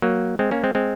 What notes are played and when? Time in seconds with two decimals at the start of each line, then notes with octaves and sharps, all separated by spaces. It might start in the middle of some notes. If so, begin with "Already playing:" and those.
0.02 F#3 A#3
0.39 G#3 C4
0.51 A#3 C#4
0.64 G#3 C4
0.75 G#3 C4